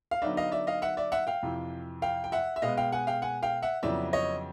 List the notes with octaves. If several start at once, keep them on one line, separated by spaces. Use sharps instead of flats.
F5
D3 F#3 B3 D#4 D5 E5
D#5 F5
D5 E5
D#5 F5
E5 F#5
D5 E5
E5 F#5
F5 G5
F2 C3 E3
F5 G5
G5
E5 F#5
E5
B2 G#3 B3 D#5 F5
F5 G5
F#5 G#5
F5 G5
F#5 G#5
F5 G5
E5 F#5
F2 C#3 F#3 B3 E4 D5 E5
C#5 D#5